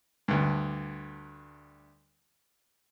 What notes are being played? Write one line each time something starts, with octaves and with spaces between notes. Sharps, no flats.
D2 G2